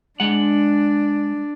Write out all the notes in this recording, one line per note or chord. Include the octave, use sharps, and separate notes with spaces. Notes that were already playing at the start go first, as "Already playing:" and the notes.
G#3 D4 F#5